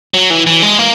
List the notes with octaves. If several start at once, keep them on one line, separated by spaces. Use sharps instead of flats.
F#3
E3
E3
G#3
A#3